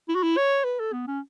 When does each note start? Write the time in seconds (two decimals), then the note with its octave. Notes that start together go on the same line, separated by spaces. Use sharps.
0.09 E4
0.15 F#4
0.23 E4
0.37 C#5
0.64 B4
0.80 A4
0.93 B3
1.07 C#4